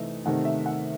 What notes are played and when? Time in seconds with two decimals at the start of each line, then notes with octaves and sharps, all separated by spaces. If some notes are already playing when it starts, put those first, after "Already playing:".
Already playing: C3 E3 A3 D#4 E5
0.25 C3 D#3 A3 D#4 F#5
0.45 E5
0.66 F#5